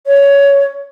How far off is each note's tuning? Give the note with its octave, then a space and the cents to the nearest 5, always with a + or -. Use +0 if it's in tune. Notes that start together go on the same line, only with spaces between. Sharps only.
C#5 +15